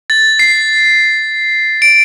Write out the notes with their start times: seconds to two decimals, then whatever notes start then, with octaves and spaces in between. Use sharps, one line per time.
0.10 A6
0.39 C7
1.82 D7